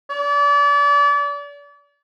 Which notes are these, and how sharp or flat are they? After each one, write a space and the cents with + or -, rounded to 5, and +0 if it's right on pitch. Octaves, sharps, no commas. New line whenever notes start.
D5 -35